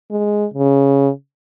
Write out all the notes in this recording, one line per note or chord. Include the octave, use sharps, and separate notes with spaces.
G#3
C#3